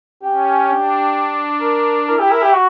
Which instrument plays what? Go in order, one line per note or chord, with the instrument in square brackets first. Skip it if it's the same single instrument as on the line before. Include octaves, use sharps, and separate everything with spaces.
[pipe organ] C#4 [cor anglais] G4
[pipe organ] D4
[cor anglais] A#4
[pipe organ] E4 [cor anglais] A#4
[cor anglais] G4
A#4
G4
F#4